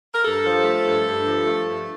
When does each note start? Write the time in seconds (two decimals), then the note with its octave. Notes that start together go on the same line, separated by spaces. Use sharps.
0.14 A#4
0.24 G2 A4
0.45 F3
0.64 A3
0.84 G2
1.05 G2
1.26 F3
1.46 A3
1.67 G2